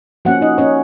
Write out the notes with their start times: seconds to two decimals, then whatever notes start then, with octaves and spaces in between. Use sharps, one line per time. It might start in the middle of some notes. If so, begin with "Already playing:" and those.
0.25 F3 A#3 C#4 F#4 F#5
0.41 D#4 D#5
0.58 C#4 C#5